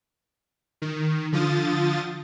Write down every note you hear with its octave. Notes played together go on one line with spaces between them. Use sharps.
D#3
D3 F3 F4 D#6 A6